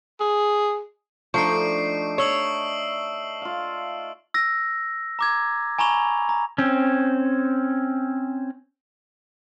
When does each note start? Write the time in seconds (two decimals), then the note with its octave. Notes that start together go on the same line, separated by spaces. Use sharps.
0.20 G#4
1.34 F3 A3 D4 D#4 C#6 C7 D7
2.18 C#5 C#6 E6 F#7
3.42 F4 F5
4.34 E6 A#6
5.19 A#5 D6 G#6
5.78 G#5 A#5 B5 C#6 F7
6.29 A#5
6.58 C4 C#4